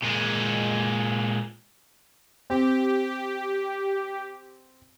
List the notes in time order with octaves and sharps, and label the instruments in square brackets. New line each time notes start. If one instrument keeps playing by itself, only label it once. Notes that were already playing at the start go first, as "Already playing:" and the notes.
[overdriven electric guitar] A#2 G#3
[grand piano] C4 [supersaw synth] G4